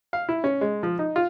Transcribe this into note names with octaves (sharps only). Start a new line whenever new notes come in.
F5
E4
C#4
G#3
F3
D#4
F4